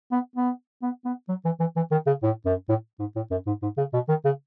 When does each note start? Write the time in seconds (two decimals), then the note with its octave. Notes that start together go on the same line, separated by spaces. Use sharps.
0.11 B3
0.36 B3
0.82 B3
1.05 B3
1.29 F#3
1.45 E3
1.60 E3
1.76 E3
1.91 D#3
2.07 C#3
2.23 A2
2.46 F#2
2.69 A2
2.99 G#2
3.16 A2
3.31 F#2
3.47 G#2
3.62 G#2
3.78 C#3
3.93 B2
4.08 D#3
4.25 C#3